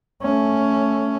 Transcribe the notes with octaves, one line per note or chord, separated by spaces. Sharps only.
A3 C#4